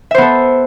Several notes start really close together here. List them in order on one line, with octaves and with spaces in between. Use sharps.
E5 C5 B3 A4